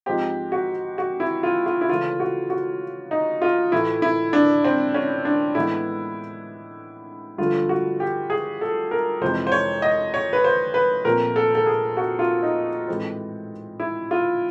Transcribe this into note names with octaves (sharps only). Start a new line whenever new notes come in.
G#2 F3 G#3 C4 G4
F#4
F#4
E4
F4
F4
E4
C#3 E3 A3 F4
F#4
F#4
D#4
F4
A2 E3 A3 E4
E4
D4
C4
C#4
D4
A2 E3 G#3 B3 E4
G2 D3 F3 A3 F4
F#4
G4
G#4
A4
A#4
F2 C3 E3 G#3 C5
C5
C#5
D#5
C#5
B4
C5
B4
A#2 F3 A3 C4 A#4
A4
A4
G#4
F#4
F4
D#4
A2 E3 G#3 C4
E4
F4